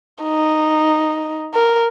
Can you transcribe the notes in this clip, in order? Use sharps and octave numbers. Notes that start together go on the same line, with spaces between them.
D#4
A#4